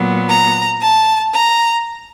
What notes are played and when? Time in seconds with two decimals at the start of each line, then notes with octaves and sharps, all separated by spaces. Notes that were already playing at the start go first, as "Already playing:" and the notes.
Already playing: A#2 F#3 B3
0.28 A#5
0.81 A5
1.33 A#5